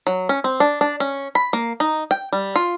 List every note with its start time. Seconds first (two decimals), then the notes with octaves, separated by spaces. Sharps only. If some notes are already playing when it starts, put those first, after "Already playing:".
0.07 F#3
0.29 C#4
0.44 C4
0.60 D4
0.81 D4
1.00 C#4
1.35 B5
1.53 A#3
1.80 D#4
2.11 G5
2.33 G3
2.56 F4